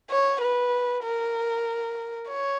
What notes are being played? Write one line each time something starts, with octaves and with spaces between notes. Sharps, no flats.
C#5
B4
A#4
C#5